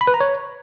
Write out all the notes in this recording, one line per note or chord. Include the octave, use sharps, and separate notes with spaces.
B5
B4
A#5
C#5